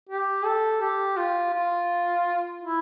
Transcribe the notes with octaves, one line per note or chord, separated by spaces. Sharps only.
G4
A4
G4
F4
F4
E4